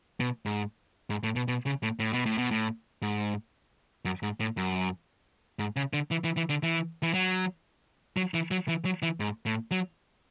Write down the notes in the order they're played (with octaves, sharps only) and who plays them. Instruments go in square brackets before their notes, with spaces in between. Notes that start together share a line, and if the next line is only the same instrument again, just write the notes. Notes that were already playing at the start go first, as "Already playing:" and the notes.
[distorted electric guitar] B2
G#2
G#2
A2
B2
B2
C#3
A2
A2
B2
A2
B2
A2
G#2
F#2
G#2
A2
F#2
G#2
C#3
D3
E3
E3
E3
D3
E3
E3
F#3
F#3
E3
F#3
E3
F#3
E3
G#2
A2
F#3